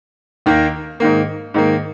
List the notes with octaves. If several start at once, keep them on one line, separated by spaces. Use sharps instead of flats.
D#2 D#3 A#3
G#2 D#3 A#3
G#2 D#3 A#3